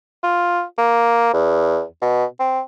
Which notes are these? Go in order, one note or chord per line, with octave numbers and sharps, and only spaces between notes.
F4
A#3
E2
B2
C4